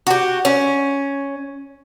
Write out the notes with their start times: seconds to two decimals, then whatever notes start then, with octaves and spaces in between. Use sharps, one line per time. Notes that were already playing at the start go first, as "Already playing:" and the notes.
0.07 F#4 G4
0.45 C#4